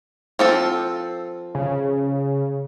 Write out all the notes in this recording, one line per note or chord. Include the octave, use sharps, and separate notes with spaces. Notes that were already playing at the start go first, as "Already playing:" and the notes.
F3 C4 A4
C#3